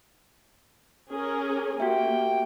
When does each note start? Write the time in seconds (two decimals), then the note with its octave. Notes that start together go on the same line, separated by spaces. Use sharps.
1.11 C#4 G#4 A#4
1.80 A#3 F#4 G4 E5 G5